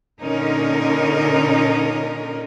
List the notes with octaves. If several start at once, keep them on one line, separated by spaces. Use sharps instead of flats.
A#2 D3 C#4 D#4 A#4